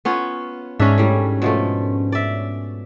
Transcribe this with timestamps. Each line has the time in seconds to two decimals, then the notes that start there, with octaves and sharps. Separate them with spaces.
0.05 B3 C#4 F4
0.80 G#2 C#4 D4 E5
0.98 A2 G3
1.42 B2 F3 A3
2.12 D5 E5